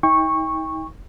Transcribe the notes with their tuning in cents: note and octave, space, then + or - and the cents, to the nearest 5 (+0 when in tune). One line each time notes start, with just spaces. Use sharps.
D#4 +40 G5 +35 C#6 -10